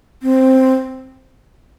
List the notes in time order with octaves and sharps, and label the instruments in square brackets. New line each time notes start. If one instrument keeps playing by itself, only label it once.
[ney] C4